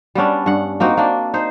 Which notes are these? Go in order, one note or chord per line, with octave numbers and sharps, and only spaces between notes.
G3 B3 C#4 D4
G2 F#5
A#3 C4 D#4 F#4
A#3 D4
D#4 C5